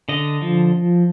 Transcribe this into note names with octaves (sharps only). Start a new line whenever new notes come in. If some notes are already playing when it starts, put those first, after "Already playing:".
D3 D#5
F3